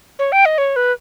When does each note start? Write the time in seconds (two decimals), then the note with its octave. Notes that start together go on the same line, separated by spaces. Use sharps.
0.19 C#5
0.32 G5
0.45 D#5
0.58 C#5
0.76 B4